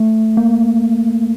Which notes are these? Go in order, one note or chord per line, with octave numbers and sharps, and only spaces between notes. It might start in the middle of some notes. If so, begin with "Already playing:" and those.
Already playing: A3
A#3